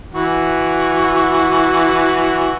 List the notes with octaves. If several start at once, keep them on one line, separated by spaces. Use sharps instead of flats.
E3 F#4